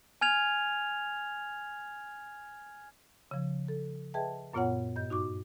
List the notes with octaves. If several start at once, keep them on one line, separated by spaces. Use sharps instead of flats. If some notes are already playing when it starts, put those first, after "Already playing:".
G#5 F6 G#6 F7
C#3 F3
A4
G#4 B4 D#5 E5 G5 A5
F#2 A#2 B3 F4 C#5 F#5
G2 D#5 G6
D#4 F#4 C#6 D6